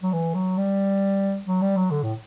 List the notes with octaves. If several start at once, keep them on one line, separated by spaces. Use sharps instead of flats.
F#3
E3
F#3
G3
F#3
G3
F#3
D3
A2